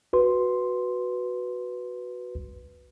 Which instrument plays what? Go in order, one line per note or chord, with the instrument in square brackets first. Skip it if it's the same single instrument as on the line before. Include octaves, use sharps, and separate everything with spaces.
[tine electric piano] F#4 B4 C6